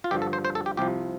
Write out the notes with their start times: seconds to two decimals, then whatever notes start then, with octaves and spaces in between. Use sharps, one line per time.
0.04 F4
0.11 G2 D3 F3 G4
0.22 A4
0.33 C5
0.45 C5
0.55 A4
0.66 G4
0.77 C2 C3 F3 G4